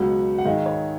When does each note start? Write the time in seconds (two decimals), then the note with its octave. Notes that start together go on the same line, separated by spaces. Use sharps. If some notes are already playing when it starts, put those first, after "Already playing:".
Already playing: C#2 B2 F#3 F#5
0.38 F#5
0.45 G#2 D#3 G#3 F5
0.66 C#5